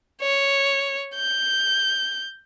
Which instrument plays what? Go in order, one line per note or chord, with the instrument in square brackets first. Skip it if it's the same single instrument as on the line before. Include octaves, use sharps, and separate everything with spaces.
[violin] C#5
G6